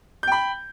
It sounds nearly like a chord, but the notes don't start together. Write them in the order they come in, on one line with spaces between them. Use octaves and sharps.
G6 G5 B5